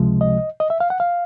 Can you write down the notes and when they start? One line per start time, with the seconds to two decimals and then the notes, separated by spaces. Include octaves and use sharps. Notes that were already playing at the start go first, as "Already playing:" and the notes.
Already playing: C#2 C3 F3 G#3
0.21 D#5
0.60 D#5
0.70 E5
0.80 F5
0.90 F#5
1.00 F5